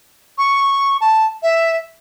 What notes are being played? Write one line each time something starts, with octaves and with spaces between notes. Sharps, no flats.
C#6
A5
E5